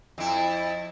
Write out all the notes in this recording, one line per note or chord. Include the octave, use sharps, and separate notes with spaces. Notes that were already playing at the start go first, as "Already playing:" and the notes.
F2 E4